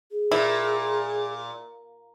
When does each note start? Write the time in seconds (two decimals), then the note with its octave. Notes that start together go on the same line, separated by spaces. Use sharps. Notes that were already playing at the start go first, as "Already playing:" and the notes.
0.11 G#4
0.31 A#2 E4